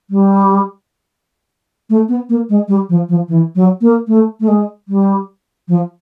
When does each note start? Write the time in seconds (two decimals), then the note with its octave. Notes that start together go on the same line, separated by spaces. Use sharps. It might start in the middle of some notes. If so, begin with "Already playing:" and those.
0.10 G3
1.90 A3
2.08 B3
2.29 A#3
2.49 G#3
2.68 G3
2.89 F3
3.09 F3
3.28 E3
3.55 F#3
3.81 A#3
4.08 A3
4.40 A3
4.48 G#3
4.88 G3
5.68 F3